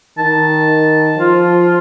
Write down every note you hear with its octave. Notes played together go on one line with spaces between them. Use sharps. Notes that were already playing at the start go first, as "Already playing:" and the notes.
D#3 A5
F3 F4